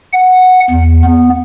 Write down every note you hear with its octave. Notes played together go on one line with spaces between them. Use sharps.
F#5
E2
B3